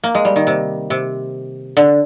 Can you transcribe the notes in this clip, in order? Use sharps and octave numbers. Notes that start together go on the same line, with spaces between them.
A#3
G#3
G3
D#3
C3
C3
D3